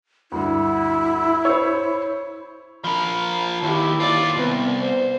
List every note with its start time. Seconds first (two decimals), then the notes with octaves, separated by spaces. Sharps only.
0.32 D2 G2 E4
1.45 C5 C#5
2.84 F3 A#4 B5
3.63 D#2 E4 G4
4.00 D#2 F4 D5
4.37 C2 B3
4.82 C5